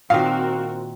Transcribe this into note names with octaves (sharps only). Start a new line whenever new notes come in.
A#2 D#3 C4 F#4 A#4 F5